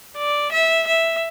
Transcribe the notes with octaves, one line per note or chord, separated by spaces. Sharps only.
D5
E5
E5